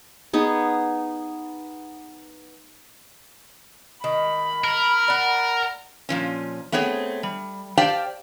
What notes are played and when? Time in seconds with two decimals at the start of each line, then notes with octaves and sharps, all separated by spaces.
0.33 B3 D#4 G#4
4.04 D#3 B5
4.64 A#4
5.08 D5 F#5
6.09 A#2 F3 C#4
6.72 A3 B3 C4 G#4 C#5
7.23 G3
7.77 G4 C5 D5 F5 G5 A5